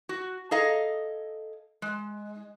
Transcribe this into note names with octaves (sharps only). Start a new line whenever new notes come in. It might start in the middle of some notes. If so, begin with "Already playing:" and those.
F#4
G#4 A4 D#5 F5 A#5
G#3